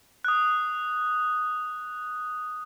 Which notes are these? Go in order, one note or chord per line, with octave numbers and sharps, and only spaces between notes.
D#6 F#6